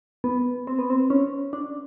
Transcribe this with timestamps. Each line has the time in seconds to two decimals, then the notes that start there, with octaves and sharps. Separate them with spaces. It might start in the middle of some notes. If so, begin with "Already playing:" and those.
0.24 B3
0.67 C4
0.79 B3
0.90 C4
1.10 C#4
1.53 D4